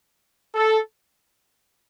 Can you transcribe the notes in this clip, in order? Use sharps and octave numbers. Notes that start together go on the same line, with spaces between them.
A4